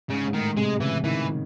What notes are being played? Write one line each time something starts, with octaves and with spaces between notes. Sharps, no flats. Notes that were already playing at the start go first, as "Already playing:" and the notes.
G#2 C#3
G#2
A2 D#3
C3 G#3
C#3 E3
D#3 E3